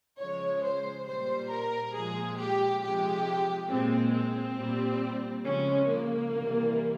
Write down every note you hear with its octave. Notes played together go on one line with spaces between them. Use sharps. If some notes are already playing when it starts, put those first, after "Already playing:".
C#3 F3 G#3 C#5
C5
A#2 G3 C5
A#4
A#2 F3 G#3 G#4
G4
C3 F3 G#3 G4
A#2 G#3 C4
C4
A#2 G3
C#3 F3 G#3 C#4
A#3
C3 E3 G3